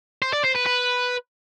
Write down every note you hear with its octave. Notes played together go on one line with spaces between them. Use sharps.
C5
D5
C5
B4
B4